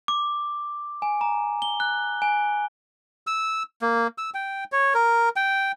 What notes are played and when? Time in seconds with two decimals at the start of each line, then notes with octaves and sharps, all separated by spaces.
0.08 D6
1.02 G#5
1.21 A#5
1.62 G7
1.80 F#6
2.22 G#5
3.27 E6
3.82 A#3
4.18 E6
4.34 G5
4.72 C#5
4.94 A#4
5.36 G5